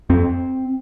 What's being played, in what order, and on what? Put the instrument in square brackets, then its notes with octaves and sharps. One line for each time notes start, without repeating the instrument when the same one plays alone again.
[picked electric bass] F2 C4